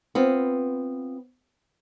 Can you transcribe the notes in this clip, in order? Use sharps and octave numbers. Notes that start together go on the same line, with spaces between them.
B3 C4 F4